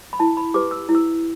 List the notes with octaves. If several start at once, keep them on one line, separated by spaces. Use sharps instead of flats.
B5
E4 A5
B5
G4 B4 D6
E6
E4
E6